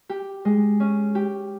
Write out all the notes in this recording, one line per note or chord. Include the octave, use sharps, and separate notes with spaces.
G4
G#3
C#4
G4